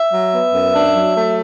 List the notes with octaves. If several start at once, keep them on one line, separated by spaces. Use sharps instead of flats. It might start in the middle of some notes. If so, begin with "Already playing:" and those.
Already playing: E5
F#3
B3
F#2
D4
F#3
A3